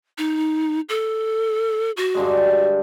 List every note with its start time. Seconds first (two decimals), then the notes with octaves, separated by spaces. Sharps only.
0.18 D#4
0.89 A4
1.97 F#4
2.15 G2 D3 G#3